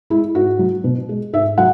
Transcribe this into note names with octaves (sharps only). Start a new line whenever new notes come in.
G#3 E4
G#2 F#4
F#3
B2
G#3
G#2 E5
F#3 F#5